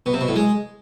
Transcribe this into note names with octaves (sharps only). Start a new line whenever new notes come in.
B2
C3
B2
A2
G#3